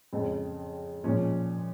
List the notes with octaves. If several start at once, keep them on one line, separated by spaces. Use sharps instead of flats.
F2 C#3 G#3 C4
A#2 F3 G#3 C#4